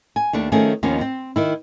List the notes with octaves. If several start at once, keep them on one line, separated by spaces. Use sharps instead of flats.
G#5
D#2 A3 D4
D#3 F3 A3 C#4 G#4
D#2 D#3 F3 B3 C#4
C4
D#3 E4